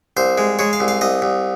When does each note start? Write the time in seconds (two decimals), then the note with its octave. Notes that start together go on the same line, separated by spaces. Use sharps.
0.17 C2 C5
0.38 G#3
0.59 G#3 C#5
0.73 F5
0.80 C2
0.88 F5
1.01 C2 D#5
1.22 C2